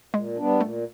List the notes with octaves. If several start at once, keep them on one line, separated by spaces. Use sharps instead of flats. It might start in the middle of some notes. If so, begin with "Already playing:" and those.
A#2 G#3
G3 B3 D4
A#2 A3